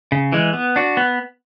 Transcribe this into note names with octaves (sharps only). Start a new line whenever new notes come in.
C#3
E3 G#3
B3
D4 F#4
B3